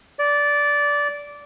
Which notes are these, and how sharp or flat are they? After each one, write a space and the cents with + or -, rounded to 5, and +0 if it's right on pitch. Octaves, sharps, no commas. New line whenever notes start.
D5 -15